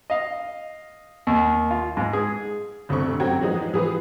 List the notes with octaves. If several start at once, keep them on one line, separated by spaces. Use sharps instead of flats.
D#5 F5
D#2
F4
G#2
G#4
G1 D2 C4 A4 C#6
F#2 C4 F#4 F#5 G5 G#6
E3 F3 G#3 D#4
E3 F3 G#4 B4